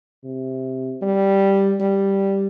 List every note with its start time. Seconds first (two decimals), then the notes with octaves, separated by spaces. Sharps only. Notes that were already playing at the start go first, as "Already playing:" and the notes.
0.25 C3
1.02 G3
1.80 G3